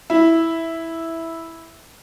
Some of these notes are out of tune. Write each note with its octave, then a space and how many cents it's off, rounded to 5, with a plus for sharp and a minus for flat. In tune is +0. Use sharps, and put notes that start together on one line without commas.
E4 -5